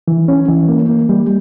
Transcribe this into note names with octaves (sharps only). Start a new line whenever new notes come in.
E3
C#4
E3
A#3
A#3
G3